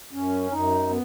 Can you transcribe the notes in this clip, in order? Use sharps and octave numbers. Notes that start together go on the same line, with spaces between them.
F#2 C#4
F#2 D#4
B3